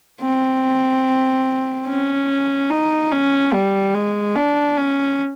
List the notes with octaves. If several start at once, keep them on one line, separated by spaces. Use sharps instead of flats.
C4
C#4
D#4
C#4
G3
G#3
D4
C#4